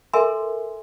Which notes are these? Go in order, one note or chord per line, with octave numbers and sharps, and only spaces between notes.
A4 A#4 E5 G#5 C6